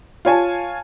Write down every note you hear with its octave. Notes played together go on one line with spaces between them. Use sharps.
F4 C#5 G#5 A5